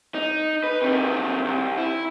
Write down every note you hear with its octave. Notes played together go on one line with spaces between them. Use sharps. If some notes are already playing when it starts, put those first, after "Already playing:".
D#4
B4
C3 D#3
C2
E4